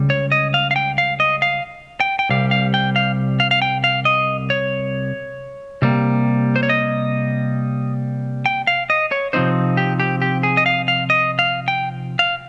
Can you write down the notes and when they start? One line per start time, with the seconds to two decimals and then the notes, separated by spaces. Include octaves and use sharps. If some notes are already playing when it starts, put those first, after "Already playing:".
Already playing: C#2 C#3 G3
0.10 C#5
0.32 D#5
0.54 F5
0.71 F5
0.76 G5
0.98 F5
1.20 D#5
1.42 F5
2.00 G5
2.19 G5
2.29 C2 C3 G3 F5
2.51 F5
2.74 G5
2.96 F5
3.40 F5
3.51 F5
3.62 G5
3.84 F5
4.05 D#5
4.50 C#5
5.82 C3 G3 A#3
6.56 C5
6.63 C#5
6.69 D#5
8.46 G5
8.67 F5
8.90 D#5
9.12 C#5
9.33 C3 F3 C4 D#4 C5
9.77 G4
10.00 G4
10.22 G4
10.43 G#4
10.57 D#5
10.66 F5
10.88 F5
11.10 D#5
11.39 F5
11.68 G5
12.19 F5